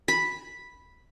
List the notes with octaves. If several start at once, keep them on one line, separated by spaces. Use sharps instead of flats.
B5